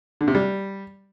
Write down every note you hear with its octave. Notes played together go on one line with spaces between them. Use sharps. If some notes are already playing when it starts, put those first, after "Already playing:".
D3
C3
G3